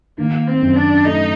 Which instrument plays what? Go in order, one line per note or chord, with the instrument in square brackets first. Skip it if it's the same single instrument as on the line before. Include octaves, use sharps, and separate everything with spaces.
[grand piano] D#3 [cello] A#3
[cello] C4
[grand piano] F#2
[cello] D4
[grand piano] A3 [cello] D#4